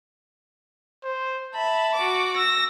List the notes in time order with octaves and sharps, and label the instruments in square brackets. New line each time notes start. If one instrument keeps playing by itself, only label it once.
[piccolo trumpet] C5
[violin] E5 B5 [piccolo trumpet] A5
[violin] F#4 D6
[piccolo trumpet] E6 [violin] A#6